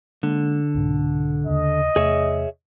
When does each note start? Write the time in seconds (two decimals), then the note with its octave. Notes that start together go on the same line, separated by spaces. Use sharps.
0.23 D3 G#3 A#3
0.75 C2 G#2 B2
1.47 D#2 C#3 D#5
1.96 E2 C3 A3 G#4 C#5 E5